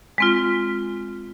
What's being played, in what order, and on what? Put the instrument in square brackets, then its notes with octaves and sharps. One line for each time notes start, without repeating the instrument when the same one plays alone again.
[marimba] G#3 C4 F4